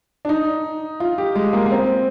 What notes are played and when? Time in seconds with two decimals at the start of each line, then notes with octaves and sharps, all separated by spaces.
0.25 D4
0.29 D#4
1.00 F4
1.18 G4
1.35 G#3
1.53 A#3
1.66 A#3
1.72 C4